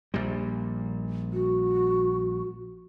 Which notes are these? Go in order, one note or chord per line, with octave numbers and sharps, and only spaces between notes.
A#1 A#2 G3
F#4